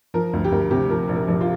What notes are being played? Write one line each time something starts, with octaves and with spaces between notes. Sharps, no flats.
F3 A#4
D2
G4
D2 A#4
C3 G4
F3 A#4
A#1
A#4
A#1
F4